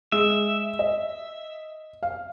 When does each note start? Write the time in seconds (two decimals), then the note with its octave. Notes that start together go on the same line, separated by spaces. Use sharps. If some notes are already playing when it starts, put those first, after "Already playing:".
0.12 G#3 E5
0.79 D#5
2.03 F5